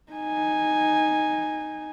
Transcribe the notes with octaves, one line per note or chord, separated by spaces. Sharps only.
D#4 G#5